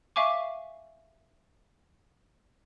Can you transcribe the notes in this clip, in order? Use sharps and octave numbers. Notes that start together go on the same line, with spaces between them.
E5 F5 G#5 C#6 D6